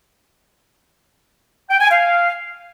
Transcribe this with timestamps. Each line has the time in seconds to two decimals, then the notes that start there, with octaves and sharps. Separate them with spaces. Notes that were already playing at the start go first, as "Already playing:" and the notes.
1.70 G5
1.80 G#5
1.90 F5